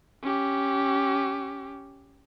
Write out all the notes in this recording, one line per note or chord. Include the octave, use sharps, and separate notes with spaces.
C#4 G4